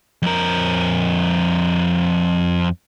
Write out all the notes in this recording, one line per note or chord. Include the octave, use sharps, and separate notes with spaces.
F2 A#4